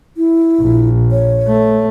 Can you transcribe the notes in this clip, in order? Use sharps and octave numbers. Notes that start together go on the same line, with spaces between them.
E4
A#1
C#5
A3